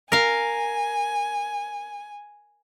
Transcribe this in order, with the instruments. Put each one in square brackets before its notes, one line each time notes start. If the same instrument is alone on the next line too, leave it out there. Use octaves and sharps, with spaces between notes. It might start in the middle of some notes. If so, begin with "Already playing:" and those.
[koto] A#4 F5 [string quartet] G#5